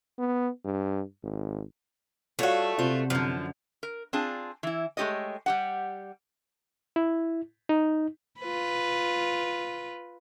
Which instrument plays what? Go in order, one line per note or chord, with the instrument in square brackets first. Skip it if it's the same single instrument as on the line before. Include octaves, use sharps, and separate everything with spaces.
[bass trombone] B3
G2
G#1
[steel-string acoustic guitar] G3 [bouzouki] A3 F#4 [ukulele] F4 C#5 F5
[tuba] C3 [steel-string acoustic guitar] F4 [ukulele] C5
[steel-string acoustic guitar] F#2 D3 [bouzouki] F3
[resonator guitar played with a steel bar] A#4
C4 D4 F4 G#4 A5
E3 E4
G#3 A3 C#4 G4 C#5 D#5
G3 G4 F#5
[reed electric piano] E4
D#4
[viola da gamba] F4 B4